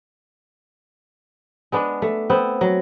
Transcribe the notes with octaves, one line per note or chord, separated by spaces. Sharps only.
G#3 B3 D4
A3
B3 C4
F#3